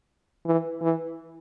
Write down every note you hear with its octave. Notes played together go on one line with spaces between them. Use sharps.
E3
E3